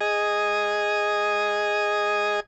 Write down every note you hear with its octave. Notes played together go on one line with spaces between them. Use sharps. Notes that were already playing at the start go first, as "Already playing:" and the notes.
G#4 D#5